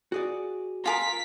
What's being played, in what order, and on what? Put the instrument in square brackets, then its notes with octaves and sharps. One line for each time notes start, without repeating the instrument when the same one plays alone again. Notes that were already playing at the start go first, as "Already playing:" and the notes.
[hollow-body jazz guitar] F#4 G#4 D5
[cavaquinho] F4 G#4 A#4 [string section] B6